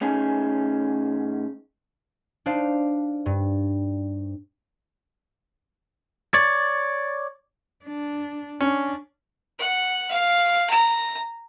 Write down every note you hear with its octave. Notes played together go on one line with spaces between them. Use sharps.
A2 C#4 D#4 G#4
D4 D#4 C5 F5
G2
C#5 D5 A6
D4
C#4 D4
F#5
F5
A#5